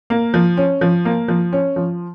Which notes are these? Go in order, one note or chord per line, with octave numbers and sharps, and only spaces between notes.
A#3
F3
C#4
F3
A#3
F3
C#4
F3